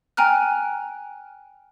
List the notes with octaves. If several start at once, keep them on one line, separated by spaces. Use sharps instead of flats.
G5 G#5 A#5 F6 F#6